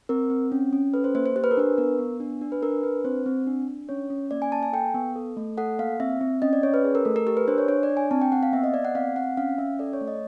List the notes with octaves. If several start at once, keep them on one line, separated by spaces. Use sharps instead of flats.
C4 A#4
C4
C#4
C#4
A4 B4
C5
A#3 C5
C5
G4 C5
B4
A#4
D4 B4
B3 A#4
B3
D4
D4
B4
D4 A#4
D4 B4
C4 C5
C4
D4
D4
C#4 C#5
C#4
A#3 D5
G#5
A#3 A5
G#5
A4 G5
B3
A4
A3
A4 F#5
A#3 F5
C4 E5
C4
C#4 D#5
D5
C#4 C#5
B4
G#4
A#4
A3 A4
A#4
G4 A#4
B4
D4 C5
C#5
D4 C#5
D5
D4
G#5
C4 A5
G5
C4 F#5
F5
B3 E5
D#5
B3 D5
F#5
C4 F5
C4 F#5
C#4 F5
C#4 E5
A4 D5
C#5
A3
D#5